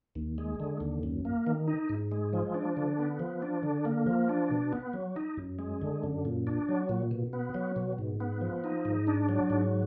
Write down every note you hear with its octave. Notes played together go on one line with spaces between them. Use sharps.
D#2
G#3
D3
D#2
F#2
A#3
D#3
D#4
G#2
G#3
F3
D4
D3
B3
F3
D4
D3
A#3
F3
D4
B2
B3
F#3
D#4
F#2
G#3
D3
F#2
A#2
D4
F#3
A#2
B2
B3
F#3
B2
G#2
B3
F3
D#4
G#2
D4
F#3
G#2